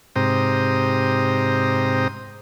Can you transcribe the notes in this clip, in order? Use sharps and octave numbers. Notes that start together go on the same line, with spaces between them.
G#2 C3 G4 C5 A#5 D#6